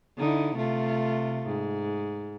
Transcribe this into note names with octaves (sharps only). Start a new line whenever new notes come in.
D3 D#4 E4
C3 A3 F4
G#2